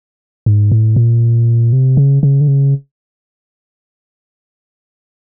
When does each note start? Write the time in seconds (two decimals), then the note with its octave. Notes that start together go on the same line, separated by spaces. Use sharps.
0.46 G#2
0.72 A2
0.96 A#2
1.73 C3
1.97 C#3
2.23 C#3
2.41 D3
2.48 C#3